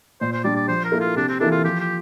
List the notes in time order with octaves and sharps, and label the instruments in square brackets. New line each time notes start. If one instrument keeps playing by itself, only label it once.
[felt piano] A#2 [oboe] C5
[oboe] C5
[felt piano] G3 D4 [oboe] D5
[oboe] D5
[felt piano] F3 [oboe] C5
[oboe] A#4
[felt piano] A#3 E4 A4
[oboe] F4
[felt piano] C3 [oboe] D4
[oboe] C4
[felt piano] E3 A#3 E4 A4 [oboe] D4
[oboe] F4
[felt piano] F3 [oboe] G4
[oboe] G4